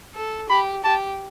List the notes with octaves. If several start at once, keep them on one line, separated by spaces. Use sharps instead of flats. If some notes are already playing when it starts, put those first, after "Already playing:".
A4
G4 B5
G4 A5